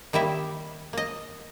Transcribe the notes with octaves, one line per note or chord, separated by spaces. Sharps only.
D#3 G3 A#3 E4 E5
A#3 D#5